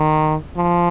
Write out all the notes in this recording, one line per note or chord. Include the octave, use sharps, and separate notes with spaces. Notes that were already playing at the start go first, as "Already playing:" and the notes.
Already playing: D#3
F3